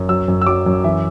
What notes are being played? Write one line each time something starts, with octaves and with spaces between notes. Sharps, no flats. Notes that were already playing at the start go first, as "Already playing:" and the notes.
Already playing: F#2
F#3 E6
F#2
E6
F#3 D6
F#2
E3 E5